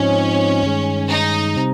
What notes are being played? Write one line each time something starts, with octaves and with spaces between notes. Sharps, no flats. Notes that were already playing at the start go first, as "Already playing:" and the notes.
Already playing: G#2 F3 C4 C#4 D#4
G2 D#3 G#3
D#4
C3 G3 C4